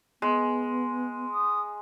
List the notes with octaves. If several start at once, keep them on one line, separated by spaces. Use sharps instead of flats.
G#3 B3
D#6